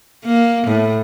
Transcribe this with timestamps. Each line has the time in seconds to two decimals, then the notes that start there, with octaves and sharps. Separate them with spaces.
0.25 A#3
0.67 A2